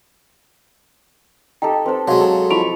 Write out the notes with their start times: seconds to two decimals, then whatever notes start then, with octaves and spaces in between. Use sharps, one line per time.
1.62 D#4 G4 A4 G5
1.86 C4 A4 B4 C5
2.08 F#3 G#3 C5 C#5 F5
2.21 A4
2.50 F3 E4 B5 C#6 D7 F7